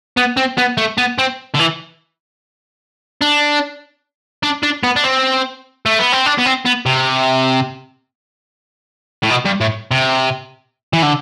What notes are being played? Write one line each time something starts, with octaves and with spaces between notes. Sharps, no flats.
B3
C4
B3
A3
B3
C4
D3
E3
D4
D4
D4
B3
D4
C4
A3
B3
C4
D4
B3
C4
B3
C3
A2
B2
G2
A2
C3
E3
D3